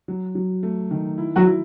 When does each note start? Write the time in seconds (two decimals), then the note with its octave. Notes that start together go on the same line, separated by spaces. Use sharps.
0.08 F#3
0.35 F#3
0.63 A3
0.91 D#3
1.18 E4
1.36 F#3 F#4
1.46 E4